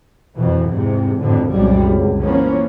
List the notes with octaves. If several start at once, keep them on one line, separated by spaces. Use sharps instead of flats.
F2 B2 E3
E2 G#2 C3
G#1 F2 A2 D3
C2 F#2 A#2 G3 G#3
C#2
E3 F3 A#3 B3 C#4